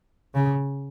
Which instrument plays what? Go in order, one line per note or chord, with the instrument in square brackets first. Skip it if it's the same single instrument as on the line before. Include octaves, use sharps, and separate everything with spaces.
[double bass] C#3